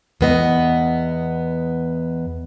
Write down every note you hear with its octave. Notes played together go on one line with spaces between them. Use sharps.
E2 B3 D#5